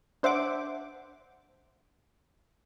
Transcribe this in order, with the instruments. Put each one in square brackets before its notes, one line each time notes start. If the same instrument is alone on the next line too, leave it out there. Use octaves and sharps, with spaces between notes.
[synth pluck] D4 C5 E5 F#5 D6